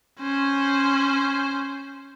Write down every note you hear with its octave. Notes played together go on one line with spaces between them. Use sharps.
C#4 C5